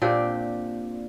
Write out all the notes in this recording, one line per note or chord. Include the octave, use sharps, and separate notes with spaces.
A#2 C4 D4 G4